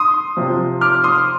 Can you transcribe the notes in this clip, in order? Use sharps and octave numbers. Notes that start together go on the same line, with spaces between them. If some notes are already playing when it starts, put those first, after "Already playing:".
Already playing: C6 D#6
C3 F3
D6 F6
C6 D#6